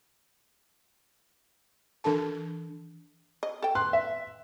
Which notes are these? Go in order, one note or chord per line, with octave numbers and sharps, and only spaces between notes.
E3 D4 A4 A5
D#5
A4 G5
B4 C6 F#6
E5